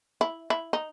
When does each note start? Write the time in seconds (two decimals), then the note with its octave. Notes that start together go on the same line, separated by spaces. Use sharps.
0.21 E4
0.50 E4
0.73 D#4